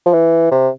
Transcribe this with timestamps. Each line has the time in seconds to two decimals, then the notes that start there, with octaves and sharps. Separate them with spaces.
0.06 F3
0.14 E3
0.51 C3